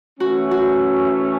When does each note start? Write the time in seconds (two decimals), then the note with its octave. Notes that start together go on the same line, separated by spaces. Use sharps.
0.19 E3 A3 C#4 F#4
0.51 F#4